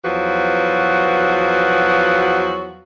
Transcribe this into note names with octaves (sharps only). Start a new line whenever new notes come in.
E2 F3 F#3 F#4 B4